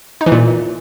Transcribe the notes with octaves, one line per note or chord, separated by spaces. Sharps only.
D#4
E3
A#2